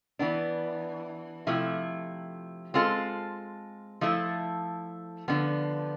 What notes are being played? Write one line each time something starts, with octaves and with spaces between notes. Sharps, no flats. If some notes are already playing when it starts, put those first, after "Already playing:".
E3 B3 D4
C3 F3 A3 E4
G#3 C4 F4 A4
F3 A3 E4 A4
D3 F3 B3